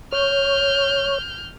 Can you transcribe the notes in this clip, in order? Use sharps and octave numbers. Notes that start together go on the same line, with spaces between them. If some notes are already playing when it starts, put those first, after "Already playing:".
C#5 F6 G6